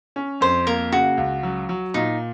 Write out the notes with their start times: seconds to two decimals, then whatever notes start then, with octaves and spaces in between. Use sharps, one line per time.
0.16 C#4
0.41 F2 C5
0.67 A#3 A#4
0.92 C#3 F#4
1.17 C#2
1.43 F#3
1.69 F#3
1.94 A#2 D#4